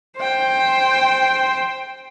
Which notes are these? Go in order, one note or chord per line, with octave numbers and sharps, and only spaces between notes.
C5 G5